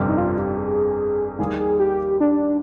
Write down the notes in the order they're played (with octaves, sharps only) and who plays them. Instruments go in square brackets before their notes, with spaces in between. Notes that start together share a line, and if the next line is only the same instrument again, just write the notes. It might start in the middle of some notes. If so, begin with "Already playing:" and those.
Already playing: [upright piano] G1 F2 C3 G3
[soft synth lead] D#4
F4
G4
G#4
[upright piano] D#2 D#3 G3 A#3 [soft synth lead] G#4
[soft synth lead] G#4
G4
D4